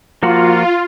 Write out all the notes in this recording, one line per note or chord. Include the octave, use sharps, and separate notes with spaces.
F3 A#3 F4 F#4